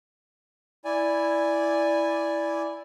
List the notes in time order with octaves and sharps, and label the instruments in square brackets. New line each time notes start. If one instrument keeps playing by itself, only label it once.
[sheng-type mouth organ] E4 D5 G#5